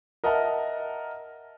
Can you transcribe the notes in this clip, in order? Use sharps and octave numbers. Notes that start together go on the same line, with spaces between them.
A#4 D#5 E5 F#5 A5 A#5